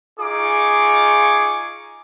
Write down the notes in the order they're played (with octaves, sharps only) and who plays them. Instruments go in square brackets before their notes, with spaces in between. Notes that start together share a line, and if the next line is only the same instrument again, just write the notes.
[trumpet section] D#4 F4 G#4 G#5 C#6 D6